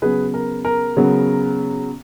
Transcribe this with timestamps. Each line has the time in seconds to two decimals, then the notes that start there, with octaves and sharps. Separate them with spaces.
0.02 C#3 F#3 B3 G#4 B4
0.34 A#4
0.65 A#4
0.97 C#3 F#3 B3